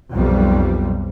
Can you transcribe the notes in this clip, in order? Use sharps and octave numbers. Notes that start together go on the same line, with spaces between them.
B1 F2 G3